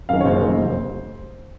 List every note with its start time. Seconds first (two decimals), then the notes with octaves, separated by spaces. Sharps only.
0.09 F#2 D#3 F5
0.21 C#5
0.25 F#1 C5
0.41 F#2 D#3
0.57 F1